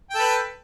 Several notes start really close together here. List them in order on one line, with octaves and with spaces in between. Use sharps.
G5 A4 B4